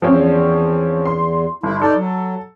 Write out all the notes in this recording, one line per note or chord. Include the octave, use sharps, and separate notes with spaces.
E2 F3 C4 C#4
C6
G1 E4
D#4 A4 D5
F#3